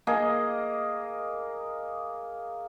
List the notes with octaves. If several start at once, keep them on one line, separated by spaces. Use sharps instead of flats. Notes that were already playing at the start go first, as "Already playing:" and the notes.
A#3 G#4 D#5